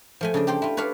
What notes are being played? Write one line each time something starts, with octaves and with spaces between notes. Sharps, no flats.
F3 A3 G#5
C#3 D4 D5
G4 A4 C5 G5
E4 F4
B4 C#5 D5 F5 A5